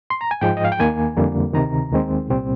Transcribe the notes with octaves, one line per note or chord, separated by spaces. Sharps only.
C6
A#5
G#5
G#2 F3 G#3 G5
D#5
F5
G5
D#2 D#3 A#3 G#5
F2 D3 G3 A#3
D2 C3 D#3 A#5
D#2 D#3 G#3 C4
C2 A#2 G3 C4